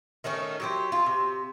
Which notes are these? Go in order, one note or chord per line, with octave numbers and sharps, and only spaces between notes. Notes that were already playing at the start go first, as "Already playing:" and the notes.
D#3 A3 C#4 D#4
F#3 G4 C5
F4
C3